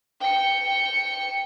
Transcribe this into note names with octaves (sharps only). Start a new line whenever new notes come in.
G5 C#7